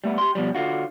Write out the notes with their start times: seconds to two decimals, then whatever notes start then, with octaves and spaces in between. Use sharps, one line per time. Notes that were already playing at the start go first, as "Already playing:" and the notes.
0.04 G3 A3 B3
0.18 G4 C6
0.35 B2 F3 G3
0.55 D3 F4 F#4